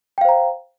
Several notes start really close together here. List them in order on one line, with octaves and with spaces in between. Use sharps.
G5 F5 C5 A#5